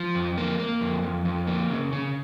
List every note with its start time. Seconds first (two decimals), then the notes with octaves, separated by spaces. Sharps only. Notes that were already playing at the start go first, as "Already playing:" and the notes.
Already playing: F3
0.15 F2
0.38 A#3
0.59 A#3
0.81 F2
1.04 F2
1.25 F2
1.47 A#3
1.70 C#3
1.93 C#3